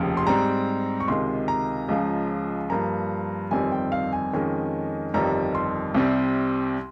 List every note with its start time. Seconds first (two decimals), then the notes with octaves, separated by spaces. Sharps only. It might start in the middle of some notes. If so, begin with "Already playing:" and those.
Already playing: F1 D#2 C#3 F3
0.17 C6
0.26 G#2 G3 C4 A#5
1.00 C#6
1.08 C#2 C3 D#3 C6
1.48 A#5
1.88 C#2 C#3 F3 G#3
2.70 G2 F3 A#3 A#5
3.51 G1 F2 D#3 G3 C4 G#5
3.72 G5
3.92 F5
4.12 G#5
4.33 F2 D#3 G#3 C#4
5.14 G1 F2 D#3 G3 A#5
5.55 C6
5.94 C2 C3 G3 C4